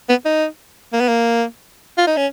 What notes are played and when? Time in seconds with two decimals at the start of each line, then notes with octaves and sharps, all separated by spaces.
0.09 B3
0.25 D#4
0.93 A#3
1.01 B3
1.08 A#3
1.98 F4
2.07 D#4
2.17 C#4